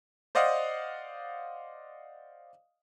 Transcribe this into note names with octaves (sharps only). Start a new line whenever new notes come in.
C5 D5 D#5 F5 F#5 D#6